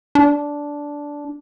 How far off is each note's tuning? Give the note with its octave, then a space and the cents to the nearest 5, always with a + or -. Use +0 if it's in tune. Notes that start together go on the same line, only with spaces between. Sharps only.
D4 -10